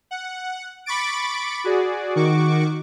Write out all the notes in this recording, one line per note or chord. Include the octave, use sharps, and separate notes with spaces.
F#5
B5 C#6 D6 A6 D7
F#4 G#4 D5
D#3 F#4 C#6 D6